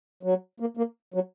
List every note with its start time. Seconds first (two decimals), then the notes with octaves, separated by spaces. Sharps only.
0.23 F#3
0.60 A#3
0.77 A#3
1.14 F#3